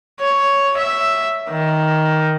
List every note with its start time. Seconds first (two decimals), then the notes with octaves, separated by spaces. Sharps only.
0.20 C#5
0.78 E5
1.49 D#3